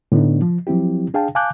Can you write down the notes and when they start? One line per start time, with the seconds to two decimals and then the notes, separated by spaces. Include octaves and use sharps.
0.12 A2 D3 A3 B3 D4 D#4
0.42 F3
0.67 F3 F#3 C4 E4 G4
1.14 D4 G#4 F5 G5 A5
1.35 F5 G#5 A5 D6 F#6 G6